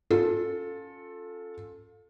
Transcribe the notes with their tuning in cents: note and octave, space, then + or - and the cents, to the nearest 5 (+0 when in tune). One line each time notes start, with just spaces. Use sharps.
C#4 +0 F4 +30 A4 +0